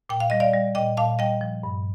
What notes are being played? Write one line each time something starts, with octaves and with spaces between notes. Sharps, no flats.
A#2 G5
F5
G3 D#5
D5 F5
G3
A#2 D#5 G5
A#2 F5 A5
G3 D#5 G5
F3
G2